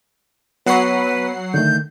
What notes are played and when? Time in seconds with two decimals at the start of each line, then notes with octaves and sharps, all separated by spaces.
0.66 F#3 B3 B4 C#5 F#5 C7
1.54 D3 D#3 A3 G6